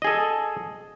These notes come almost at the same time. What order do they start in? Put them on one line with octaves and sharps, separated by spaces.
D#5 G#4 A4